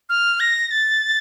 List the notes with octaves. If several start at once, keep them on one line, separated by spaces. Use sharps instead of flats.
F6
A#6
A6